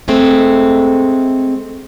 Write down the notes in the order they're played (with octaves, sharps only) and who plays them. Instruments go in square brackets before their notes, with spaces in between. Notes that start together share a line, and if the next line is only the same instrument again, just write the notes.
[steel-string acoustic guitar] G#3 A3 C4